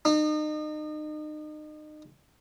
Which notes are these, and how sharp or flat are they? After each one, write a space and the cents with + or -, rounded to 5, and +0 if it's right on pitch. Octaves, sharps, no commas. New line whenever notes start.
D#4 -35